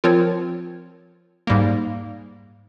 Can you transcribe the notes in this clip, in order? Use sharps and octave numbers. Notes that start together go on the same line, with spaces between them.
F3 C4 F4 A#4 C#5
G#2 G3 A#3